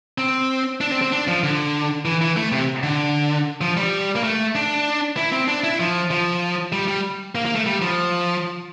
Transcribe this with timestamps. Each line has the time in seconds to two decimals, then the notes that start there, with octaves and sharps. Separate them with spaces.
0.18 C4
0.81 D4
0.91 C4
1.02 C4
1.12 D4
1.28 F3
1.43 D3
2.05 E3
2.21 E3
2.37 A3
2.52 C3
2.83 D3
3.61 F3
3.77 G3
4.16 A#3
4.24 A3
4.55 D4
5.17 E4
5.32 C4
5.48 D4
5.64 E4
5.80 F3
6.11 F3
6.72 G3
6.88 G3
7.35 A#3
7.45 A#3
7.55 A3
7.66 G3
7.81 F3